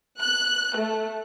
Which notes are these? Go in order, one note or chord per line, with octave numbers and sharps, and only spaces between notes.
F#6
A3